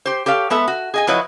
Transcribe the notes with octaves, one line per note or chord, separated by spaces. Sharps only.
G4 C5
G4 A4 C#5 F5
G#3 B3 A4 E5
F#4
G#4 D#5 G#5
F3 F#3 E4 B4 C#5 D#5